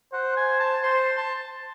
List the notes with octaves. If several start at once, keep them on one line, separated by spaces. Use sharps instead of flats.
C5 F#5
G#5
A5
C5 C6
A5